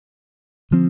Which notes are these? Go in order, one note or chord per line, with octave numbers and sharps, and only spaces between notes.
D3 F3 C4